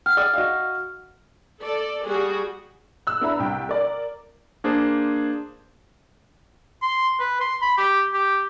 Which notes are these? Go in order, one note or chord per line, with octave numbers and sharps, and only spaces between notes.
F#5 F6
D5 D#6
F#4 D#5 F5
A4 D5
G3 F#4 G#4
E6 F#6
B3 D4 E4 A#5 B5
C2 G5
A#4 D5
A#3 D4 G#4 C5
C6
B4
C6
B5
G4
G4